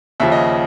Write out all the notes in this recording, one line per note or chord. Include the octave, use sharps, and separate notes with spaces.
D#2 C#3 F3 E5
D#5